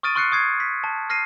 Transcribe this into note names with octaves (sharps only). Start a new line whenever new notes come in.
C#6 D#6 F6 A6 D7 D#7
C6 C#6 F6 F#6 C7 C#7
C#6 D#6 G#6 C7
B6
A5
F6 A#6 C7 D#7